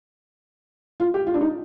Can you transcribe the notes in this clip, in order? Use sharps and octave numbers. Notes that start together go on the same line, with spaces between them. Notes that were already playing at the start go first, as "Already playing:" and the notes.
F4
G4
F4
D4
D#4